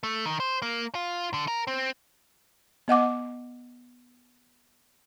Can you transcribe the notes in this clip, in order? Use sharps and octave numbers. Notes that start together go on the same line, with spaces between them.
A3
D#3
C5
A#3
F4
D3
A#4
C4
B3 D#5 F#5 D6